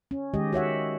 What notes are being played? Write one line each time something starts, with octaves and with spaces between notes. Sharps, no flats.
C#4
D#3 G#3 G4 D#5
F#4 C#5 E5 F#5